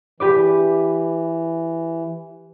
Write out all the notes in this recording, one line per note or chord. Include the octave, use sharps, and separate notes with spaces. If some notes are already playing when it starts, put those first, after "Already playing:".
E3 G4 B4 D5